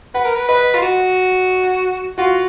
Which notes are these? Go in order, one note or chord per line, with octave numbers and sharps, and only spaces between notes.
B4 F#5
A#4
B4
B4 D#5
F4
F#4
F4 F#4